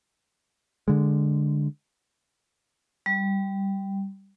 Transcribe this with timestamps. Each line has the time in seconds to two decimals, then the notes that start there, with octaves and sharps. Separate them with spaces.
0.88 D3 G#3
3.06 G3